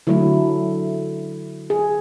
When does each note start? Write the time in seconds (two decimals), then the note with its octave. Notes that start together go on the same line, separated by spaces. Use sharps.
0.07 D3 F#3 A3 E4
1.70 G#4